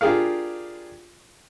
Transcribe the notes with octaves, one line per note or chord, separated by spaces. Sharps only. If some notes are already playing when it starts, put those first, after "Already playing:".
D4 F4 G4 G#4 A#4 F5